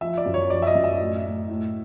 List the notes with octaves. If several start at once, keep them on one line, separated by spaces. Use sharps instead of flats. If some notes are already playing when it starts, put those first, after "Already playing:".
F3 E5
D5
F#2
C#5
F3 D5
E5
D#5
F#2
E5
A2
A2
A2